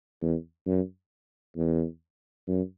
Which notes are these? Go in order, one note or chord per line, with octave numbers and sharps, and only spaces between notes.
E2
F#2
E2
F#2